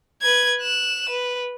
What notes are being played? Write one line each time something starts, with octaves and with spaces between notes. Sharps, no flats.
B4 G#6
F#6 E7
B4